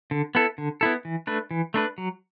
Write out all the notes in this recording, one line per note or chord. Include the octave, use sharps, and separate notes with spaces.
D3
B3 E4 A4
D3
B3 E4 A4
E3
A3 D4 B4
E3
A3 D4 B4
F#3